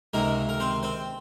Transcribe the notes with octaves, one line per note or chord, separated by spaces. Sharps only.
C#2 C3 D#3 A#3 A#4
A#4
C4 C5
C4 C5